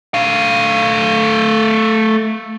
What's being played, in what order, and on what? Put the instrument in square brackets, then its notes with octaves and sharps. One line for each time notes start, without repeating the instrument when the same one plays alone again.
[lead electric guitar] A3 F5